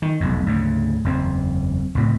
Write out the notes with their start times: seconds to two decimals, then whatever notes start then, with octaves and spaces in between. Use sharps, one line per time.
0.02 D#3
0.20 F1 B1 E2
0.46 D2 G#2 C#3
1.04 F#1 E2 C4
1.95 C#2 A2 C3